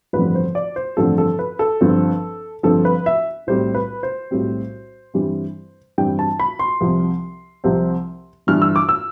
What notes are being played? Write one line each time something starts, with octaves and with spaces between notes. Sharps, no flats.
A1 G2 D3 F3 C4 B4
C5
D5
C5
A1 G2 D3 F3 C4 A4
A4
B4
A4
G1 G2 F3 C4
G1 G2 F3 C4 A4
B4
E5
B1 A2 G3 C4 C5
B4
C5
B1 A2 G3 C4
G2 E3 G3 C4
G2 E3 G3 C4 G5
A5
B5
C6
C2 C3 F3 C4
C2 C3 F3 C4
G1 G2 E3 F6
E6
D6
E6